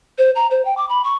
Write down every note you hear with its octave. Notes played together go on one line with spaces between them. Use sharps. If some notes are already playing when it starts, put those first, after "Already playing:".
C5
A#5
C5
G5
D6
B5
C#6